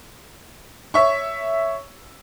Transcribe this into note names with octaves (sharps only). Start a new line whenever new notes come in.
C#5 E5 C#6